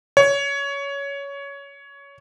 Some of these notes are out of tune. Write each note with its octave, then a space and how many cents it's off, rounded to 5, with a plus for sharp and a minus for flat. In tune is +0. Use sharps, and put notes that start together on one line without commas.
C#5 +15